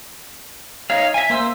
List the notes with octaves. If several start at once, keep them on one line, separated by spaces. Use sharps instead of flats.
D#4 C#5 F5
E5 G#5
A#3 C5 E6